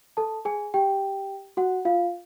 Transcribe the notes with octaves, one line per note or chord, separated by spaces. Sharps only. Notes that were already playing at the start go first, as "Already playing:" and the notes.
A4 A5
G#4 G#5
G4 G5
F#4 F#5
F4 F5